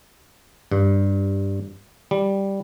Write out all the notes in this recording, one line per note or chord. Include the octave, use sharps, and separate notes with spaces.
G2
G3